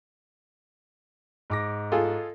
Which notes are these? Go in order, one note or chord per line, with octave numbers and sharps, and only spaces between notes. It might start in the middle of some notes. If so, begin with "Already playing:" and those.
G#2 D6 A#6
F4 G#4 A4